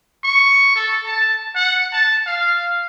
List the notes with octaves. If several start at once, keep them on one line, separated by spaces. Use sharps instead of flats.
C#6
A4
A5
F#5
A5
F5